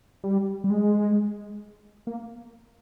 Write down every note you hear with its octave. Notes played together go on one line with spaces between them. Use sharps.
G3
G3
G#3
A#3